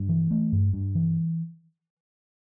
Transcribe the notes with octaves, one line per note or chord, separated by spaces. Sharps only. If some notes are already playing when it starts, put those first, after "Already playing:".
Already playing: G2
E3
A3
G2
G2
E3